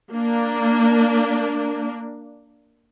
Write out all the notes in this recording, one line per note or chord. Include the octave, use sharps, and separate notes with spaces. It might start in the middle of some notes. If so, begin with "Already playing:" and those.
A#3 D4